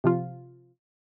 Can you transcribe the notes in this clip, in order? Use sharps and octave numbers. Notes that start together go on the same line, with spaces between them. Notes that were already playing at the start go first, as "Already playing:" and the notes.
C3 F3 F4